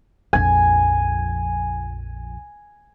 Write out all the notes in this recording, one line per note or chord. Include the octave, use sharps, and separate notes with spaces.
A#1 F2 G#5